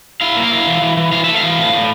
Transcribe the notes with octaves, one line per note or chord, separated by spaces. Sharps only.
E4 F5
A#3
F5
E4
E3
E3
E3
E3 F5
A3 E5
F5
E3
A2
A2